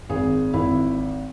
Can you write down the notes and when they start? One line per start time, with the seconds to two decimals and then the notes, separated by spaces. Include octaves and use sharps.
0.09 G#1 G#4
0.53 G#1 E4